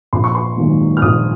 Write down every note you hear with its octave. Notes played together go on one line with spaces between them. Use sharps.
A#1 C6
C#6
C6
G#2 D#3 F#3 A#3
F6
A#1 D#6